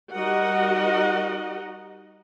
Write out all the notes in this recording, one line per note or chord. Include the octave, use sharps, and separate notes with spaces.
G3 D#4 F#4 A#4 D#5 F#5